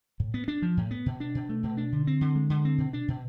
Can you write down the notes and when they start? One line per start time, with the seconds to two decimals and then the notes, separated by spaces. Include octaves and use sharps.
0.20 A2
0.34 B3
0.48 D4
0.62 F3
0.77 A2
0.91 B3
1.06 B2
1.20 D4
1.35 B2
1.49 A3
1.63 B2
1.77 D4
1.92 D3
2.07 C4
2.21 D3
2.35 G#3
2.50 D3
2.65 C4
2.78 B2
2.93 D4
3.08 B2